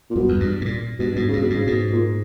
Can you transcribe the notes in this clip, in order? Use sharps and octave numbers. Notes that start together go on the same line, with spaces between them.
A#2
G2 B2
E2
G2
G#2
A#2
G2 B2
G#2 B2
C#3
G2
B2
G#2 C#3
G#2 B2
A#2